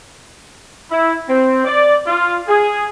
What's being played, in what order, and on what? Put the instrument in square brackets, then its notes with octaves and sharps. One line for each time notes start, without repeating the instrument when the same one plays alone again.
[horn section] E4
C4
D5
F4
G#4